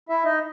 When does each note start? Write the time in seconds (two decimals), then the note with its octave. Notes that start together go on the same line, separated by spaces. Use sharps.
0.09 E4 E5
0.24 D#4 D#5